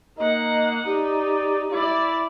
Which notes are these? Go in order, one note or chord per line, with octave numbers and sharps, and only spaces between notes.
A#3 D#4 D#5 F#5
D#4 G4 D5
E4 D5